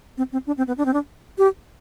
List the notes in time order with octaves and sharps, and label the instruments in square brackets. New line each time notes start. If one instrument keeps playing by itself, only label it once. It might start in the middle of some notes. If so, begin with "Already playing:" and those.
[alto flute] C4
C4
D4
C4
B3
D4
C4
D4
G4